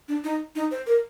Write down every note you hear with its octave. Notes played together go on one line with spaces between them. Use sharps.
D4
D#4
D#4
C5
A#4